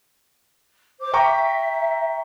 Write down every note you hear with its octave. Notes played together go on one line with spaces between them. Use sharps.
C5 D6
E5 G5 A#5 C#6